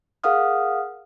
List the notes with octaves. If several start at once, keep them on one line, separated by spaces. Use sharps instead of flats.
G#4 A#4 F5 F#5 D#6 F6